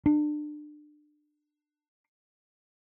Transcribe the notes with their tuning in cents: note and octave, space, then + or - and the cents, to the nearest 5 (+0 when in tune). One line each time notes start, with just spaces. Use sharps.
D4 +30